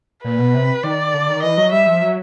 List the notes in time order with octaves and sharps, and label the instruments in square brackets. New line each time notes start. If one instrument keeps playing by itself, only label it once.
[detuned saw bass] A#2 [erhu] B4
[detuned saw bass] B2
C3
[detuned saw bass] D#3 [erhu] D5
[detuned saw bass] D3
D#3
[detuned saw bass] E3 [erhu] D#5
[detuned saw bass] F#3
[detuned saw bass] G3 [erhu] E5
[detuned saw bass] F3
F#3